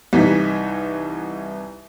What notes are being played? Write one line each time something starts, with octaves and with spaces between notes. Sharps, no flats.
C2 E3 D#4 B6